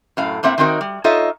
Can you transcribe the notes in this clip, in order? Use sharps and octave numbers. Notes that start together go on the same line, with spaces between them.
F#2 A2 F5
A2 A#3 C4 E5 F#5
D#3 F#3 C4 D#4 F#4 A#4
G3
D#4 F4 A4 C#5 D#5 E5